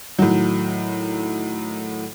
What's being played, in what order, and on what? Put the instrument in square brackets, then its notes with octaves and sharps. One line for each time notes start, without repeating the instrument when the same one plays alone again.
[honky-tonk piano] A2 D#3 F#3